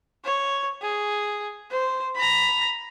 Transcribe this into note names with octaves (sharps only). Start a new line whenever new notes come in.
C#5
G#4
C5
A#5 B5